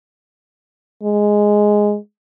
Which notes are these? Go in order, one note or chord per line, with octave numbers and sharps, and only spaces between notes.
G#3